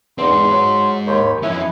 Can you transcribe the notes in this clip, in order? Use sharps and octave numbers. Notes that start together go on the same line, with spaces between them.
E2 C4 D#4 F4
G#2 G#4
F#3
D#2 C5 C#5 B5
F2 C#4 E4 B4 D#5 G#5